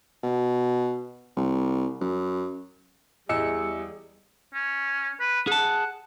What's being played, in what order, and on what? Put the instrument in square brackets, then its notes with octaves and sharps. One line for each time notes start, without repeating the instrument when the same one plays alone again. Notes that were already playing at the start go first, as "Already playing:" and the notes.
[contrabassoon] B2
C2
F#2
[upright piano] E2 [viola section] G3 G#4 [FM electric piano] D#5 E6 C#7
[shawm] C#4
B4
[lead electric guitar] G#4 A5 [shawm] F#5